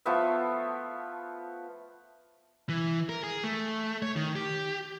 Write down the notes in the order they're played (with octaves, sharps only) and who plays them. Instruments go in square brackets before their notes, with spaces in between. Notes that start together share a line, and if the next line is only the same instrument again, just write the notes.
[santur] F3 A3 B3 E5
[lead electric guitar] E3
A#4
G#4
A3
C#5
D#3
G4